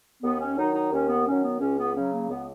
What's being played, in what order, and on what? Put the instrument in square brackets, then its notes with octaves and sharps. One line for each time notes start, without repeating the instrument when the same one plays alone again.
[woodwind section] D#2 B3
C#4
D#3 F#3 D#4
D#4
D#2 C#4
B3
D#3 F#3 C#4
B3
C#2 C#4
B3
C#3 F#3 C#4
A#3
C#2 B3